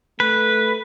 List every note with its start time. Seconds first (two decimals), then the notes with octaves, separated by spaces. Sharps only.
0.20 A3 B4